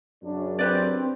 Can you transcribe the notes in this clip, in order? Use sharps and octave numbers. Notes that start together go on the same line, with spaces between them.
F#2 C#3 D4
C4 G4 B4 D5